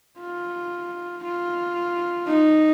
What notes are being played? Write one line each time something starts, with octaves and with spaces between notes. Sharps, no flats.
F4
F4
D#4